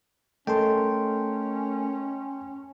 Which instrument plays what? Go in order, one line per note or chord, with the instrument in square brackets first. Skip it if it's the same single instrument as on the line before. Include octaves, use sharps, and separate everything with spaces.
[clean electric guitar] A3 [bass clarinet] C#4 [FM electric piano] A4 A#4 D#5 [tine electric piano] G5 A5 C6